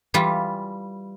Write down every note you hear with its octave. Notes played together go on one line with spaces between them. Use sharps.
E3 G3 F4